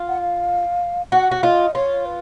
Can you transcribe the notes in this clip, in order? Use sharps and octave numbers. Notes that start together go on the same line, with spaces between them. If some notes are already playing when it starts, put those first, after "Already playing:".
Already playing: F4
F#5
F5
F#4 F#5
F#4
F4 D#5
F4 C#5
B4